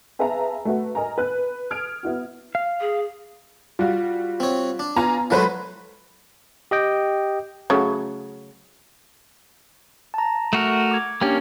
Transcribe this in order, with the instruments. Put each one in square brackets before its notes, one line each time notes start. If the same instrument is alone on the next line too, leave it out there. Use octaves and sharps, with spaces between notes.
[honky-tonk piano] G#4 B4 E5 F5 A5 A#5
A3 F#4 B4
A#4 D#5 G#5 A#5
B4 F#6
D#6 F6 G#6 D7
B3 E4 F#4
[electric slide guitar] F5
[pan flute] G#4
[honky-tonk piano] G3 F#4 [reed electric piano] F4 F5
[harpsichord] C4 C#5
D4
[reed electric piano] B3 [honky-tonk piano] F4 G#5 A#5
[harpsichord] F#3 G#3 A3 [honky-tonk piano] F4 B4 C5
[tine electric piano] G4 D#5 G5
[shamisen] C#3 F#3 A3
[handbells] A5 A#5
[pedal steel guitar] A3 F#4 A#4
[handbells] D6 G#6
[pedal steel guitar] A#3 C#4 [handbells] D4 G4 G5